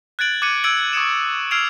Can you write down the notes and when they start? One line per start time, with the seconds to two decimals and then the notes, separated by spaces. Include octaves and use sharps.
0.19 F#6 G#6 A6 D7 F#7
0.42 D6 F#6 G#6 C#7 D#7 F#7
0.64 E6 G#6 D7 D#7 F#7
0.93 C#6 D#6 G#6 C#7 E7
1.51 E6 F6 G#6 C7 D7 F7